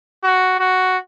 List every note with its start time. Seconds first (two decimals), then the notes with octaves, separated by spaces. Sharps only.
0.23 F#4
0.59 F#4